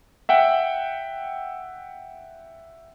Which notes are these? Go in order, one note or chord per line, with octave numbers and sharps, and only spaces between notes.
E5 F#5 G5